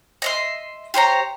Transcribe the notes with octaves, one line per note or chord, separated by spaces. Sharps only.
D#5 E5 C6
G4 C5 C#5 A#5